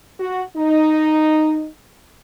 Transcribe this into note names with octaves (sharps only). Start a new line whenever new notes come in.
F#4
D#4